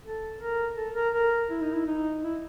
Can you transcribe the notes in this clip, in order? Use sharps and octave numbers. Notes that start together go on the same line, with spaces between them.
A4
A#4
A4
A#4
A#4
E4
D#4
E4
D#4
E4